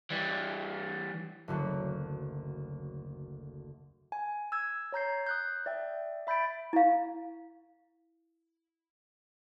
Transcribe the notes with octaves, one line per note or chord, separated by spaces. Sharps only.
E3 G3
F#1 D2 D3 F#3
G#5
E6 G#6
C#5 A#5 G6 C7
D#6 F#6 G6
D5 E5 G5
E5 B5 G6 A6 D7
E4 F5